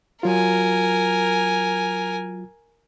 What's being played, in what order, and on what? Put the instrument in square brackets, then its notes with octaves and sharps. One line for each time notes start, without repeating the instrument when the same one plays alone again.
[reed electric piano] F#3 F4 [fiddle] A#4 G#5